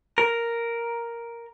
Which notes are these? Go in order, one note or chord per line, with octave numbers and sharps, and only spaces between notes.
A#4